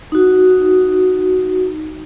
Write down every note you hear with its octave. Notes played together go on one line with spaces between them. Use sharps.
D#4 F#4